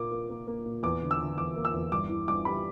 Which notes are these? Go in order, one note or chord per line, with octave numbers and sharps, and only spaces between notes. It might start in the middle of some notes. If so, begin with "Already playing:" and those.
Already playing: A#2 A#3 D6
A#3
A#3
A#3
A#2
E2 D6
D3
E6
D3
E2 D6
A#3
E6
E2
G2 D6
E3
G2 D6
G3 B5